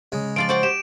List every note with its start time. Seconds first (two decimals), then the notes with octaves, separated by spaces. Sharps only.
0.12 C#3 G#3
0.36 F3 F4 D5 D7
0.49 F#4 C5 D5 F#5
0.63 G4 E7